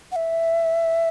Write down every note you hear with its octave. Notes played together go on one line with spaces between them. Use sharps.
F#5
E5